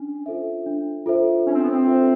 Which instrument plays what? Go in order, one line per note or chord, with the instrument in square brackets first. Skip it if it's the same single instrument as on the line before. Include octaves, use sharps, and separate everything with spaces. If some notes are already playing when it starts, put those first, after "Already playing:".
Already playing: [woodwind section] C#4 [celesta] D4
[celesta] F4 A4 C5 E5
D4
F4 A4 C5 E5
[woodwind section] C#4 [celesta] D4
[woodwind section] C4
B3
C4
[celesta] F4 A4 C5 E5